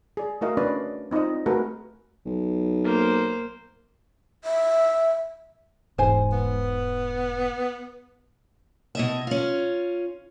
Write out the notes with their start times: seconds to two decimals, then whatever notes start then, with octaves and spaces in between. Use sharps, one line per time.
0.17 G#4 D5
0.41 A3 E4 F#4 A#4 D#5 F5
0.57 C#4 D4 B4 C#5 D5
1.11 C4 D#4 F4 D5 D#5
1.46 A3 F#4 G#4 A#4 B4
2.26 B1
2.84 A#3 C5
4.43 E5
5.98 E1 G#2 C5 G#5
6.32 B3
8.95 B2 D#5 E5
9.27 C#4 F4